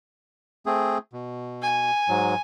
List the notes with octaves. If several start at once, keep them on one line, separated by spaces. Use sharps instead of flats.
A3 C4 G#4
B2
G#5
G#2 F#3